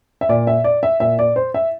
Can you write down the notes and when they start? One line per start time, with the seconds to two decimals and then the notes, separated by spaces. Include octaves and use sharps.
0.21 E5
0.29 A#2 D5
0.47 E5
0.64 D5
0.83 E5
1.00 A#2 E5
1.19 D5
1.36 C5
1.54 E5